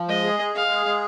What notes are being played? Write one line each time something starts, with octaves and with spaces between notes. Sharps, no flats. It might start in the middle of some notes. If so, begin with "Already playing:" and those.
Already playing: F3
G#3 D#5
G#4
G#3
G#3 F5
G#4
G#3